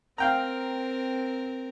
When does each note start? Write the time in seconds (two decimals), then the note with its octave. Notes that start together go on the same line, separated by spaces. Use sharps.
0.18 C4 A#4 F5 G5 A#5